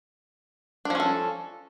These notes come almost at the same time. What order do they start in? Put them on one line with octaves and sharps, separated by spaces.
D4 F3 C#4 A4